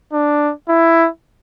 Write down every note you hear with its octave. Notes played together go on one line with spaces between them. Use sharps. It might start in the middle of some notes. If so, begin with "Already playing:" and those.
D4
E4